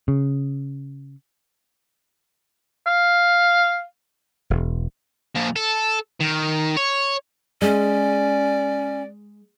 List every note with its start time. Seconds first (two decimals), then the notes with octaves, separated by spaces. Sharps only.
0.08 C#3
2.86 F5
4.50 E1
5.36 A#2 F3
5.56 A4
6.20 D#3
6.77 C#5
7.62 G#3 C#4 D5